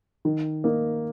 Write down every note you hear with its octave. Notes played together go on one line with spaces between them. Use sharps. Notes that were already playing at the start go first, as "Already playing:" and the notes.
D#3
A#3 D#4